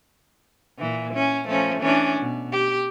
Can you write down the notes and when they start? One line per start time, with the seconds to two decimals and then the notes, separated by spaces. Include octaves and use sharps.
0.79 A#2 E3
1.14 C#4
1.46 F3 A3 C#4
1.80 E3 C#4 D4
2.19 B2
2.52 G4